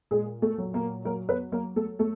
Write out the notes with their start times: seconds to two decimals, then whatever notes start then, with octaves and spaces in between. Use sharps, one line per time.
0.11 A#2 G#3 G#4
0.42 A3 A4
0.58 F#3
0.74 A#3 A#4
1.05 F#3 A#3 A#4
1.29 B3 B4
1.52 F#3 A#3 A#4
1.76 A3 A4
1.99 A3 A4